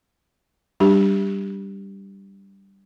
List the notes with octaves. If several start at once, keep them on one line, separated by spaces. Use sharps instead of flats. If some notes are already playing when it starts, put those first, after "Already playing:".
G3 D4 G4